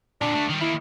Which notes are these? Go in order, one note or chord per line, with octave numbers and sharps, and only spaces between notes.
A#2 D3 D4
A3 F#4
D#3 G3
D#3 A#3 E4